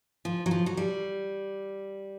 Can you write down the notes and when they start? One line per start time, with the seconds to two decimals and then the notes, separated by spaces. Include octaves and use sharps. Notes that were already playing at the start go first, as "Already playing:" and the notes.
0.25 F3
0.46 F#3
0.51 F3
0.66 F#3
0.77 G3